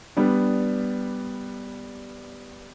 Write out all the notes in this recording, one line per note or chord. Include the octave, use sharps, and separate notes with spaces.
G3 B3 D4